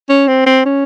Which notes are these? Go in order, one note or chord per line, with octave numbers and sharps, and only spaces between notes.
C#4
C4
C4
C#4